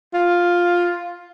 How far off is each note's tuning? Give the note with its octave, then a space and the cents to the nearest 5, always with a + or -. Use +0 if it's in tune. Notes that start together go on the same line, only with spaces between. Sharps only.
F4 +5